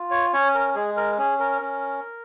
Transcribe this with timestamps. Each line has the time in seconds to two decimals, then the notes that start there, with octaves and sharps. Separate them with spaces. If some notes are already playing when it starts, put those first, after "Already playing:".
Already playing: F4
0.11 C#5
0.33 C#4 C#5
0.55 A#4
0.75 G#3 G#4
0.97 A#4
1.18 C#4 G#4
1.40 A#4
1.62 C#4